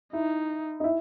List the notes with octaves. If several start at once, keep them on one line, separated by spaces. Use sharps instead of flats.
D#4 E4
D#4
E4